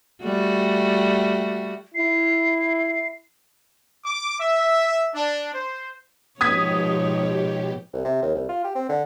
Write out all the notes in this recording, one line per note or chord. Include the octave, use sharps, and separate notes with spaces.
G3 A3 F#4
E4 C7
D6
E5
D4
C5
G#2 B2 F3 G4 C#5 D#6 G#6 B6
C2
C3
D#2
C2
F4
G4
C4
D3